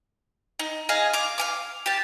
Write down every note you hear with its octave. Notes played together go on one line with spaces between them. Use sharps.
D#4
G#4 D#5 F5 G#5
F5 D6
F5 G#5 D6
G4 A5